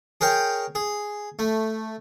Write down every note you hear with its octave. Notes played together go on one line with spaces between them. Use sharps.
G#4 A#4 C#5 G5
G#4
A3